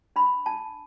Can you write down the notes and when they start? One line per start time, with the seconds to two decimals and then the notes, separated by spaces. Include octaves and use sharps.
0.16 D4 B5
0.46 D4 A5